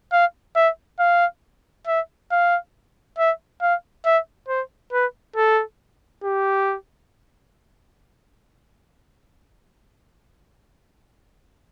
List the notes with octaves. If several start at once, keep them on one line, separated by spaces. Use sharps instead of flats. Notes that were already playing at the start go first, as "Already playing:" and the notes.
F5
E5
F5
E5
F5
E5
F5
E5
C5
B4
A4
G4